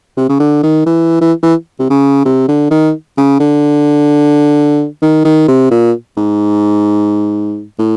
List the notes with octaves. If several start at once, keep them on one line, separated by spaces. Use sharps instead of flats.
C3
C#3
D3
D#3
E3
E3
E3
C3
C#3
C3
D3
D#3
C#3
D3
D#3
D#3
C3
A#2
G#2
A2